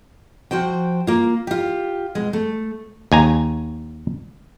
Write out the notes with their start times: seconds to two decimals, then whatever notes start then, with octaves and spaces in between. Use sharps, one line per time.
0.51 F3 F#4 C5 G5
1.07 A#3 F4
1.47 F4 G4
2.15 B2 G#3
2.33 A3
3.12 D#2 G#5 A#5